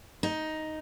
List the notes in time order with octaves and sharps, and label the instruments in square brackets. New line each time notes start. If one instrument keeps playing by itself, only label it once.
[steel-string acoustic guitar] D#4